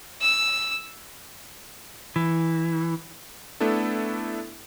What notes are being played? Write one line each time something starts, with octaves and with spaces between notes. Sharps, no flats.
E6
E3
A3 B3 D4 E4 A4